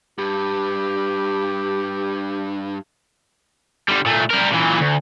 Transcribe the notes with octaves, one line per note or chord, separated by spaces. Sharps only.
G2 G4
D3 G3
A#2 A3
G3 A#4
A#2 E3
D2